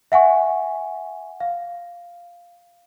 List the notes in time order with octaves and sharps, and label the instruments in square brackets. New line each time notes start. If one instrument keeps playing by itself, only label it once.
[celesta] E5 F#5 G#5 C#6
F5